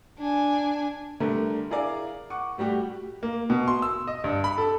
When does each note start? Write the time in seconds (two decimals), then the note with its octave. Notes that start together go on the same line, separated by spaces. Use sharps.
0.18 D4 G#5
1.20 D3 G3 A3 A#4
1.71 E4 G#4 A#4 D5 F5
2.30 F#5 C#6 D6
2.58 A2 G3 F#4 G4
3.23 A#3
3.50 B2
3.68 C6
3.82 E6
4.07 D#5
4.24 G2
4.44 B5
4.58 A4